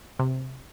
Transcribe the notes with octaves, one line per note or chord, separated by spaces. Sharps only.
C3